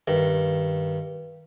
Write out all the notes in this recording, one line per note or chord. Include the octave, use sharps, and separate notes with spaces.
G2 D#3